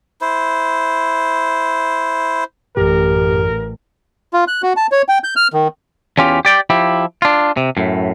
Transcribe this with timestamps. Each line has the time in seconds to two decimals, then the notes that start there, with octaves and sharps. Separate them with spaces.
0.21 E4 C5
2.77 A1 F#2 G4 A#4
4.33 F4
4.48 F#6
4.63 F#4
4.77 A5
4.92 C#5
5.08 G5
5.24 G6
5.36 F6
5.53 D#3
6.18 E2 C#4 F4 G4
6.45 G4 D5 G5
6.70 F3 E4 G4
7.22 D4 F4
7.57 C3
7.77 F#2 A2